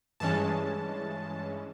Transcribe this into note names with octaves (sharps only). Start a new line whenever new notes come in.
G2 E3 G#3 C#4 A5